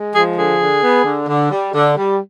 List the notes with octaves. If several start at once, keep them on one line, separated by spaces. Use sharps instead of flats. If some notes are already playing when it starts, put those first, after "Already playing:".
Already playing: G#3
F3 G#4
D3 G#4
D3
B3
D3
D3
G3
D3
G3